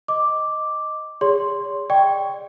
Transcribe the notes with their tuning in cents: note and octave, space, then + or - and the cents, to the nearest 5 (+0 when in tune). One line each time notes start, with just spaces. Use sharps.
D#5 +0 D6 +0
G#4 -35 C#5 +35 C6 +0
D5 +30 G5 +0 C#6 +15